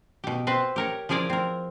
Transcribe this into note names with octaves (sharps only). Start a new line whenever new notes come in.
B2 G4
C4 B4 C5
G4 A#4 C#5
F3 E4 G#4 A#4 D5
C4 A#4